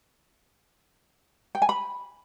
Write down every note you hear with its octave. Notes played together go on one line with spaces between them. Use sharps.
G5
G#5
B5